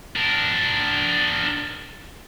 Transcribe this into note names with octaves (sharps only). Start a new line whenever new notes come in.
D4 A#4